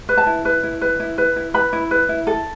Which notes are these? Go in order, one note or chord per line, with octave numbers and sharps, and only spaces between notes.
B4
A5
E4
B4
E4
B4
E4
B4
E4
B4 B5
E4
B4
E4
A4